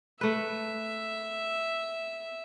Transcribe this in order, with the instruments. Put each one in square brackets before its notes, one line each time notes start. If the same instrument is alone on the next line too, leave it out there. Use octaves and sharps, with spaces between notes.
[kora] A3 B4 [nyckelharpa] E5